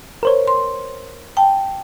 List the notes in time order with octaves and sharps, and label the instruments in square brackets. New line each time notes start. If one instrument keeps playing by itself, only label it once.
[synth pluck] A#4 C5 C#5
[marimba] C6
G5 A5